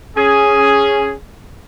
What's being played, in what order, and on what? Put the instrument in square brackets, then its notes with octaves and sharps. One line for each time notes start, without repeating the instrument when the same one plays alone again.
[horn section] C#4 G#4